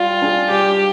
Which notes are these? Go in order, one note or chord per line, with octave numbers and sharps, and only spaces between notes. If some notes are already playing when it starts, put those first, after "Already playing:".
Already playing: G3 F4
D4 G#4
G3 G4